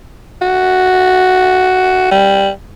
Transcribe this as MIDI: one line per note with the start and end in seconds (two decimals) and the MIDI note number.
0.41 2.09 66
2.11 2.50 55